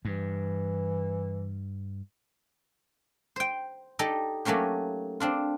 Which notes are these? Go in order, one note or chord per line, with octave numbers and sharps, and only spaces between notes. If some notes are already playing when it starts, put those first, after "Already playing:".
G2 E3
C5 G5
D#4 G4 A4 D5 D#5
F#3 A3 A#3 C#4 G4
C4 D4 F4